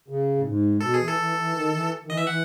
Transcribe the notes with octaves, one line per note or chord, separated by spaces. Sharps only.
C#3
A2
G#2
B2 A4
G#4
E3
A4
E3
E3
D#3
E3
D#3
E3 D#5
E5
E3 F#5